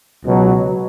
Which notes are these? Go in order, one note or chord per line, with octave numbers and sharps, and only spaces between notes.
C#2 B2 F#3